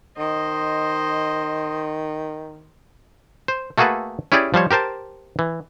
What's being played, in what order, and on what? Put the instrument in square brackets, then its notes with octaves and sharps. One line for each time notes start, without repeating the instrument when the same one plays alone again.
[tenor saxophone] D#3 [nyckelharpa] C5 D#5
[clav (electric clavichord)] C5
A3 A#3 F#4 G#4 A4 B4
C#4 E4 G4 G#4 D5
F3 G3 C5 C#5
G4 A#4 C5 A5
E3